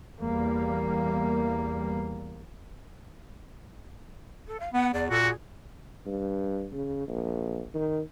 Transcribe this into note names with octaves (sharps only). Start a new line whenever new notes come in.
E2 G3 A#3
A4
F5
B3 F#5
E2 D5
A#2 F#4 A4
G#4
G2
C#3
A#1
D#3